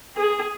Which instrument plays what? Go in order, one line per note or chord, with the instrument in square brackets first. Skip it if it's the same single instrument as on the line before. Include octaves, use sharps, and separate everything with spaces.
[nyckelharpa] G#4